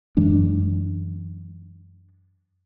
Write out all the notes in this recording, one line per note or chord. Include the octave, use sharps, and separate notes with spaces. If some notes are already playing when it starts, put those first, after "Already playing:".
F#2 E3 G#3 D4